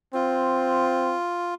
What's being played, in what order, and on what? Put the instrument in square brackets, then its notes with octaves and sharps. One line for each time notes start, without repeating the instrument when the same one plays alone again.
[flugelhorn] C4 [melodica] F4